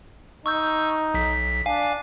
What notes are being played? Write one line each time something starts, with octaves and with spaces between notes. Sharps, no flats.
D#4 C#6 E6 G6
B1 B6
D4 F5 G#5